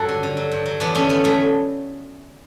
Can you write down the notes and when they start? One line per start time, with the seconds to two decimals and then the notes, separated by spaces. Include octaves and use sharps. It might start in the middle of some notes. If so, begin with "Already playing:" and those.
Already playing: G2 F#3 F#4 A4
0.09 D3
0.23 D3
0.37 F#3
0.51 G2
0.66 F#3
0.80 E2 B3 D4
0.95 D3 A3 C#4
1.09 E2 B3
1.24 F#3 A3